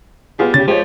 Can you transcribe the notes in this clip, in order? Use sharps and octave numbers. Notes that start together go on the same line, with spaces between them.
G3 B3 F4 G#4
C#3 C#4 G4 A6
F3 G#3 G4 C#5